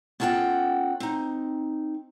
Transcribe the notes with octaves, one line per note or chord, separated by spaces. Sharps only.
B3 C#4 F4 A4 F#5 G5
C4 D#4